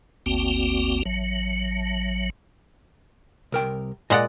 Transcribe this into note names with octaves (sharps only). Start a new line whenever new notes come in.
G1 D2 A#3 C4 F#4
A1 F#3
C2 A#4 G5
A#2 G#3 D5 D#5 F#5